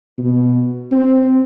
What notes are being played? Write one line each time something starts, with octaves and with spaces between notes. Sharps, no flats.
B2
C4